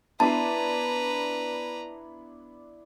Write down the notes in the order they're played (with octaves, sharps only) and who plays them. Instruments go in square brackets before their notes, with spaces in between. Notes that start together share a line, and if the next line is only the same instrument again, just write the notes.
[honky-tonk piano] B3 D4 [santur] E4 D5 C6 [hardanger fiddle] B4 A#5 [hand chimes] A5